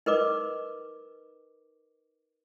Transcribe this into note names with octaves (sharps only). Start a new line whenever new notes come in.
D#4 A#4 B4 D#5 D6